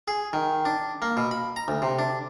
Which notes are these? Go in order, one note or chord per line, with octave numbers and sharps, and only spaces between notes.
G#4
D#3
D4
A#3
B2
B5
A#5
D2
C3
D4